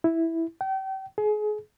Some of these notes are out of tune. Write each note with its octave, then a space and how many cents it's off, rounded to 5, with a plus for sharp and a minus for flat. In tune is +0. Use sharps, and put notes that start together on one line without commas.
E4 -5
G5 -35
G#4 +30